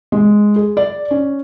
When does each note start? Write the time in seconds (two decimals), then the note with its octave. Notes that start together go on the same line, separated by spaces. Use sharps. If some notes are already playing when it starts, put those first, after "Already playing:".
0.12 G#3
0.56 G#4
0.77 D5
1.11 C#4